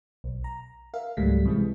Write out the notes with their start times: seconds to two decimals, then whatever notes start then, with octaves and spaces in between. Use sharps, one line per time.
0.24 B1
0.44 A#5
0.94 A#4 E5 F5
1.17 C#2 G#2 F#3 G3 A3 B6
1.45 C3 E3 G#3